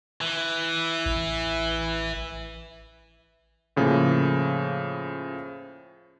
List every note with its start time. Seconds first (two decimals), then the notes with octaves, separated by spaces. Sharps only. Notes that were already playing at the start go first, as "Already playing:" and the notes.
0.21 E3
1.06 A1
3.76 A2 C#3 F3 A#3